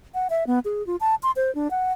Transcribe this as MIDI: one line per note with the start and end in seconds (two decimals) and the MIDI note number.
0.14 0.28 78
0.30 0.47 76
0.47 0.59 59
0.65 0.85 68
0.87 0.96 65
1.00 1.15 81
1.23 1.31 84
1.36 1.53 72
1.55 1.70 62
1.71 1.92 78